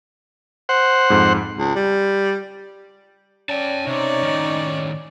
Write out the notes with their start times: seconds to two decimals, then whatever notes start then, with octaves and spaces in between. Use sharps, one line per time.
0.69 C5 F#5
1.10 F2 G#2
1.58 C#2
1.75 G3
3.50 C#4 D5 G5 A5
3.87 C3 D#4 C#5 D5
4.23 A2 D#3